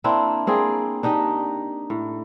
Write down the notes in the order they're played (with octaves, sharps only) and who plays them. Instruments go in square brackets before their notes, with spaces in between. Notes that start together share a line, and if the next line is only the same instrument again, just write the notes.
[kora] A#3 C4 D4 E4
A#3 C4 G#4 D5
D4 D#4 G4 D#5
A2